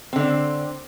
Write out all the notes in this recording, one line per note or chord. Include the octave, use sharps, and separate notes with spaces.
D3 C4